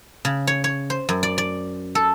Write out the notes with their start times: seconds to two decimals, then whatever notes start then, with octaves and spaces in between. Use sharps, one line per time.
0.25 C#3
0.47 C#5
0.64 C#5
0.90 C5
1.09 F#2
1.23 D5
1.38 D5
1.95 A4